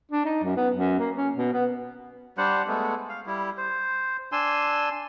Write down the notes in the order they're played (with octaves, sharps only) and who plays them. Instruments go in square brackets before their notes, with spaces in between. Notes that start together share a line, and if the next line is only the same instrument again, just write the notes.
[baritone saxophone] D4
D#4
F#2
B3
F#2
A#3
C#4
B2
B3
[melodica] G3 D4 C5 F#5
G#3 A3 B3
F5
G3 E4
C5
D4 G#5 C6 E6